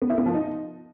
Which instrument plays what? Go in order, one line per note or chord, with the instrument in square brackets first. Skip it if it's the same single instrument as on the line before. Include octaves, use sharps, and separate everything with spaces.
[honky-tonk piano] B3
E4
B3
F3
D#4